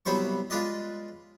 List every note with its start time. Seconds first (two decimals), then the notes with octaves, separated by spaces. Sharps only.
0.05 C2 F#3 B3 E4 C5 C#6
0.50 G#3 F4 B4 D5 D#5